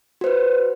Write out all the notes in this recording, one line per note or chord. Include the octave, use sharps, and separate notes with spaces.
F#4 B4 C5